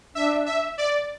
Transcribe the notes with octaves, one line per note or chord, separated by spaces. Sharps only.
D4 E5
E5
D5